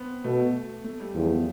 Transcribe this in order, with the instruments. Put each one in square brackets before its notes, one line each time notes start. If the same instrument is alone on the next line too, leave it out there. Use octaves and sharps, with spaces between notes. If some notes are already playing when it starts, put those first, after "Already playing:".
Already playing: [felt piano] B3 C4
[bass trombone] B2 [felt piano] A3
[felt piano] A3
G3
[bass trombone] E2 [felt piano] F3
[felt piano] A3